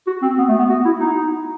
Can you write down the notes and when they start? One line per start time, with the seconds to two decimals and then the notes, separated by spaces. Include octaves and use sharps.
0.07 F#4
0.22 C4
0.38 B3
0.48 A3
0.59 B3
0.69 F#4
0.85 E4
1.00 D#4